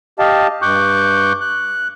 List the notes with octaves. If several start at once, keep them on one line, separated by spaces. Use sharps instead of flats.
G4 D#5 F5 A5
G2 C#6 D6 F#6 G6
F#6